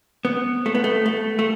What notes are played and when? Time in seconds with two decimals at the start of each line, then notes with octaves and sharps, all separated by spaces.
0.25 B3
0.66 A3
0.75 B3
0.84 A3
1.06 A3
1.39 A3